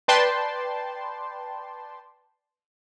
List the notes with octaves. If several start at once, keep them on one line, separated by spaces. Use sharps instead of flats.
B4 D5 G5 A5 C6